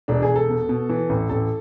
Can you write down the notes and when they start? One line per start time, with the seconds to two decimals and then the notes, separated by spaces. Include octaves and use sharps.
0.08 E1 D4
0.22 G#4
0.28 E1
0.36 A4
0.49 B2
0.69 B2
0.89 E3
1.09 A1
1.29 A1 A4